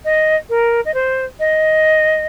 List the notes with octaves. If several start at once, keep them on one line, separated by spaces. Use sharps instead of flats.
D#5
A#4
D#5
C5
D#5